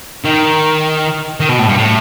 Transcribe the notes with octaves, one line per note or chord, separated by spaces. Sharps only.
D#3
D#3
B2
A2
G2
A2